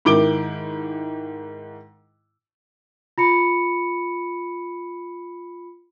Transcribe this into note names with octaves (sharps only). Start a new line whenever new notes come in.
G#2 D#3 E4 D6 D7 G7
F4 B5 C#7